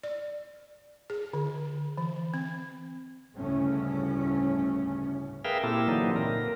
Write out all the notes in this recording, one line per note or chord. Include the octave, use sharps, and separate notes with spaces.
D5
G#4
D3
E3
C4
G1 D2 A2 C#3 C#4
G#4 A#4 B4 E5 F5 G5
A#2 A#3 C4 E4 G4 A4
D3 E3 F#3 A#3 C4 D#4
A#2 A#4